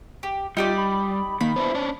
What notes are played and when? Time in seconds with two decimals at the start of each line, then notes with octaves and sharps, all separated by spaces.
0.23 G4
0.57 G3 D#4 F4 G4 D5
0.78 B5
1.41 D#3 A#3 B5
1.56 B3 D4 E4 C5
1.74 C#4 D4